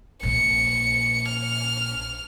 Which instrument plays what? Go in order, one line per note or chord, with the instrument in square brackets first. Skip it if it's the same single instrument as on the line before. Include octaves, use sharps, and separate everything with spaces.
[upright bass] A#1 A#2 [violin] C#7
[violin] F6